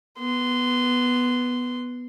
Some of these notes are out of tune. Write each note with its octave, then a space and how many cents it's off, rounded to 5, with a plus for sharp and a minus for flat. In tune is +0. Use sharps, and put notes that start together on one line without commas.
B3 +0 C6 -15